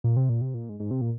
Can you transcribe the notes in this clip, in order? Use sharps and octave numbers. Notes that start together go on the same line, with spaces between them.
A#2
C3
A#2
C3
A#2
G#2
G#2
C3
A#2